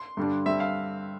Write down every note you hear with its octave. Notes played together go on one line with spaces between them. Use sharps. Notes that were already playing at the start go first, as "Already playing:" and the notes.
Already playing: C6
G2 D3 G3 D4
G2 D3 G3 C4 E5
F5